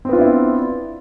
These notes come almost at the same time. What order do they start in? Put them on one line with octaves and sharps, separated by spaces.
C4 B3 F4 D4 E4